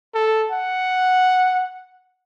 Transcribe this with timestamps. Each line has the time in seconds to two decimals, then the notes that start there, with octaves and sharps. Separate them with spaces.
0.15 A4
0.52 F#5